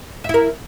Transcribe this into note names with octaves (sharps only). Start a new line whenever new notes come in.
E4 A#4 E5